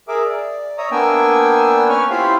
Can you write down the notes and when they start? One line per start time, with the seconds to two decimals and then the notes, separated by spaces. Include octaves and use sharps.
0.08 G#4 A#4 E5 D6
0.25 D5
0.78 C#5 E5 A#5 D#6
0.91 A#3 B3 D4 G5 G#5 E6
1.89 C#4 B4 C#5 G#5 C#6 F6
2.10 E4 F4 G4 C5 E5 F5